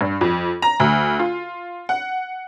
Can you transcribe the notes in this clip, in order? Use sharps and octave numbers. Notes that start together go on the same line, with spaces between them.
G2
F2
A#5
D2
F4
F#5